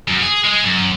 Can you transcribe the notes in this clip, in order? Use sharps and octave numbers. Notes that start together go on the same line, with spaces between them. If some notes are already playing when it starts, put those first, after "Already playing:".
F#2
G#4
G#3 G#4
F#2